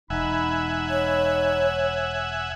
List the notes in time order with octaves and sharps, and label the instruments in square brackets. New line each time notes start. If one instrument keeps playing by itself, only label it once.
[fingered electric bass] E1 [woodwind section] D#4 B5 [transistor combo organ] E5 F#5 G#5
[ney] C#5